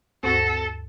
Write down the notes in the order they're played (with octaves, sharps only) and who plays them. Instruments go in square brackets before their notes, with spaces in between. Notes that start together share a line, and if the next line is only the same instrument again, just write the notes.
[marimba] D2 G2 C#6 [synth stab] C4 F#4 A#6 [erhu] A4